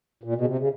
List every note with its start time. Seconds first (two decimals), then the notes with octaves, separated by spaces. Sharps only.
0.24 A#2
0.35 B2
0.41 C#3
0.46 C3
0.58 C#3